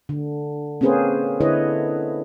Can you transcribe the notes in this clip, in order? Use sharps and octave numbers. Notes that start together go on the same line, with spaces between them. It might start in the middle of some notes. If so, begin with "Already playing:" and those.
D3
A#3 C4 C#4 G#4 B4 C5
D3 E4 B4 C#5 D#5